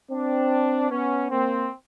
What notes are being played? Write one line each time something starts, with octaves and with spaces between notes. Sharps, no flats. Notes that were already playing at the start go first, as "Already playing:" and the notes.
C4 D4
B3 C#4
A#3 C4